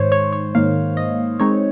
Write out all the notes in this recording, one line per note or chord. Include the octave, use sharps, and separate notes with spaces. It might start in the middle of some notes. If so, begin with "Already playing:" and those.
Already playing: G#2 D#3 C5 C#5
C#5
C#5
G#2 D#3 A#3 F5
D#5
D#3 G#3 C4 D#4 C#5